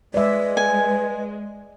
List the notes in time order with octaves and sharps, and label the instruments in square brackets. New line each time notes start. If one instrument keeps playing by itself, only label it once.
[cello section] G#3 [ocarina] B4 [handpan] D5 E5
[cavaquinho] G#5